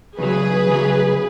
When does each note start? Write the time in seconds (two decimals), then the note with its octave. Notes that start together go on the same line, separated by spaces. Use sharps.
0.18 E2 C#3 F#3 G#4 B4
0.67 E2 C#3 F#3